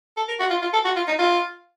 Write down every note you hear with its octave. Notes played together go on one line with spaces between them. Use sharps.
A4
A#4
F#4
F4
F4
A4
F#4
F4
D#4
F4